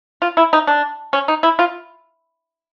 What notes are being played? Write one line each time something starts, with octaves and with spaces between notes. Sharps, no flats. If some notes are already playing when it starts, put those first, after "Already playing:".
F4
E4
D#4
D4
C#4
D#4
E4
F4